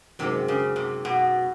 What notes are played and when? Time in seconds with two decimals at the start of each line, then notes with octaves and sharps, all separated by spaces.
0.19 F#2 C3 D#3 G#3 C4
0.48 C#3
0.76 C3
1.05 B2